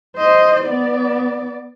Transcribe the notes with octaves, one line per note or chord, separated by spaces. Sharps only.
C5 D#5
B3 D5